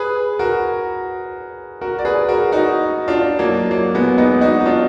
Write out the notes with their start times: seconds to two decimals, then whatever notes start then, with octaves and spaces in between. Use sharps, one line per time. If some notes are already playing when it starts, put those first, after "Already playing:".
Already playing: G#4 B4
0.39 F#4 A#4
1.81 F#4 A#4
1.99 D5
2.05 G#4 B4
2.29 F#4 A#4
2.52 D#4 F#4
3.08 D4 F4
3.39 F#3 A#3
3.71 F#3 A#3
3.95 G#3 B3
4.18 B3 D#4
4.41 D#4 F#4
4.60 D#4
4.65 D4 F4